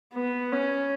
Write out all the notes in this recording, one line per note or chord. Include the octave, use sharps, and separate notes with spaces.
B3
C#4